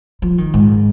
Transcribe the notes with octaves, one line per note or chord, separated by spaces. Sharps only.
F3
D#3
G#2